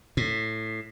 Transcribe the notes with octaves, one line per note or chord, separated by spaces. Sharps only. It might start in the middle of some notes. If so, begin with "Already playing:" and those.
A2